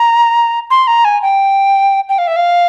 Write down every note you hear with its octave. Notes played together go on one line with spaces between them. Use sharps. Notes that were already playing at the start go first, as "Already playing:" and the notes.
Already playing: A#5
C6
A#5
G#5
G5
G5
F5
E5
F5